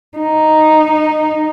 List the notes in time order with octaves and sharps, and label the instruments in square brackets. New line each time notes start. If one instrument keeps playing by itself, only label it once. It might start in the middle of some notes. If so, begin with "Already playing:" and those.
[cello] D#4